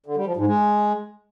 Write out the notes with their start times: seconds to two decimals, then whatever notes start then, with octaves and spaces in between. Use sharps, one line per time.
0.06 D3
0.16 G3
0.26 F3
0.36 G#2
0.47 G#3